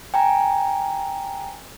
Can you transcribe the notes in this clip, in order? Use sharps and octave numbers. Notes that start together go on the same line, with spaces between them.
G5 G#5 A#5